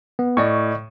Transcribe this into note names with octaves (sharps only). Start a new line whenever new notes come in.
B3
A2 D5 D#5 C#6